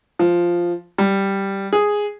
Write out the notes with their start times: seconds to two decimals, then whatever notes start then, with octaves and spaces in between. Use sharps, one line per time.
0.19 F3
0.98 G3
1.73 G#4